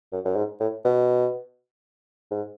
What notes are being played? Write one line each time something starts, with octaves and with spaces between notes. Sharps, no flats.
F#2
F#2
G#2
A2
B2
G#2